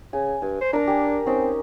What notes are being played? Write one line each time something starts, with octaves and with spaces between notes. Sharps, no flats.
C#3 G#5
G2 G#5
C5
D4 A#4 A#5
G4 A#4 G#5
C4 C#4 D#4